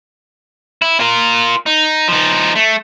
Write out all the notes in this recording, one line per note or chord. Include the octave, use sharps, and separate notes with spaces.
E4
F4 A#4
D#4
F3 D#4
A3